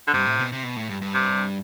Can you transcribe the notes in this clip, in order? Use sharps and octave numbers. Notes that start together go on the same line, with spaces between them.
D3
G2 C3
A2
B2
C3
B2
A2
G2
G2
C3